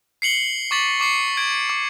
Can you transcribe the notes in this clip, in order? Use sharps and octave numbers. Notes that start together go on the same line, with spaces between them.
C7 C#7 F#7 G7
C#6 D6 A6 B6 F#7
C#6 D6 C7 C#7
G#6 D7
D6